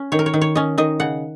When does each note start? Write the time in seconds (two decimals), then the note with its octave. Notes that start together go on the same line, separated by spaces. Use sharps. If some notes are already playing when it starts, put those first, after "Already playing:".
Already playing: C#4
0.12 D#3 C#5
0.19 A#4
0.26 C#5
0.34 D#3
0.41 C#5
0.55 C#4 D#5
0.78 D#3 D#5
1.00 C#3 F#5